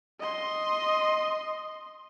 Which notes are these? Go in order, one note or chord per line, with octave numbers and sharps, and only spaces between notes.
D#5 C6